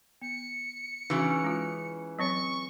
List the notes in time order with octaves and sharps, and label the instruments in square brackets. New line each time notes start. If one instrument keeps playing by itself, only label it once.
[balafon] B3 [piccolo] C#7
[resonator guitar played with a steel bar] C#3 E3 [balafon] D#4 F#4
[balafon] G#3 C#4 F4
[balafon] F#3 C4 C#5 [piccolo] C#6